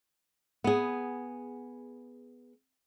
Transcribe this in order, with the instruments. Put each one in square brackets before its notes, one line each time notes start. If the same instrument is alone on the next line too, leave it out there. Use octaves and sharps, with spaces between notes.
[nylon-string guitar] B3 G#4